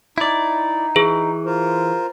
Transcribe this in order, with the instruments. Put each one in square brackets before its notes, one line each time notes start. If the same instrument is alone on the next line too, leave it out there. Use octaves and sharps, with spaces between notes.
[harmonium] D#4 [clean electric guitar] E4 D5
[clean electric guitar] E3 [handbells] G#4
[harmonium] F4 A#4 C5